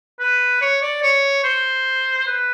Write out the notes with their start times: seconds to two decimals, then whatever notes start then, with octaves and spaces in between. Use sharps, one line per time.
0.19 B4
0.61 C#5
0.82 D5
1.03 C#5
1.44 C5
2.27 B4